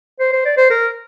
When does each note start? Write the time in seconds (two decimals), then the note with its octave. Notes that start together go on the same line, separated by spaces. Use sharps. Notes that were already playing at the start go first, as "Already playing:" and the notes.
0.20 C5
0.33 C5
0.45 D5
0.57 C5
0.70 A#4